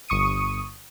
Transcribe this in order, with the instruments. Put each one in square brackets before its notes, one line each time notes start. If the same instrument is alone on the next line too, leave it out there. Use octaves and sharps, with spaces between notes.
[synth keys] G1 C#6 D#6 C#7 D#7